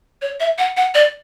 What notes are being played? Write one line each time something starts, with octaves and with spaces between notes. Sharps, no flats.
C#5
E5
F#5
F#5
D5